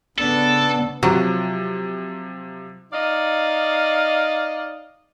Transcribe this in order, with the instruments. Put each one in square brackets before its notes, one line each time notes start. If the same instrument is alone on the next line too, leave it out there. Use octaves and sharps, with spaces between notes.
[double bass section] C#3 B3 [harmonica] D4 [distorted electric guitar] A4
[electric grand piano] C3 F3 [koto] F#3
[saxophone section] D#4 D5 D#5 F5